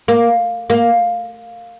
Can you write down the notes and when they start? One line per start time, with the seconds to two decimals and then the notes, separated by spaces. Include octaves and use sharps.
0.08 A#3
0.70 A#3